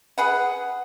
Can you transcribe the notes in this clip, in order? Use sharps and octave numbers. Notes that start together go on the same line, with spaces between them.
G#4 B4 F#5